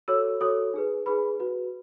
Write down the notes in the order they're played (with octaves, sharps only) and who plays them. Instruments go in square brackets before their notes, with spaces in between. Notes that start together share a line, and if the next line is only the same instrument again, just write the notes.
[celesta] F#4 A4 C#5 E6
F#4 A4 C#5 D#6
D#4 G#4 B4
D#4 G#4 B4 B5
F#4 B4